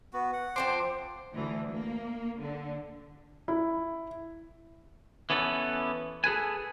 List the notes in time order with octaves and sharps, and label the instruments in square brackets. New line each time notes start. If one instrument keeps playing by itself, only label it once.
[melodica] B3 F#4
F#5
[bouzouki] F3 C4 C5 [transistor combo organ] C6 D6
[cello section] D2 E3
A#3
D3
[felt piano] E4
[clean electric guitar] E3 B3 C#4 A4
G#4 A4 B4 G#5